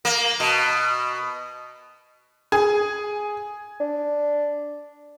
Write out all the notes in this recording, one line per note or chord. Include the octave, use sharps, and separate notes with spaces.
A#3
B2
G#4
D4